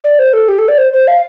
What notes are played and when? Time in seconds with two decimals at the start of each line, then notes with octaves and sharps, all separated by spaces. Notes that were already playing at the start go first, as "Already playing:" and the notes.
0.04 D5
0.19 C5
0.33 A4
0.48 G4
0.59 A4
0.68 D5
0.78 C5
0.93 C5
1.08 F5